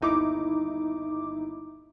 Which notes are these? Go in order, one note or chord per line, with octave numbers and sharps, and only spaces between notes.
G1 D#2 D#4 E4 D6